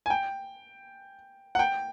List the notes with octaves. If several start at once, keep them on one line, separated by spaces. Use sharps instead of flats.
G#5
G5
F#5
G5